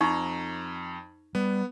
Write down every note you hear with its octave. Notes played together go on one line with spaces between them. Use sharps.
F2 D#4 A#5 C#6
G3 B3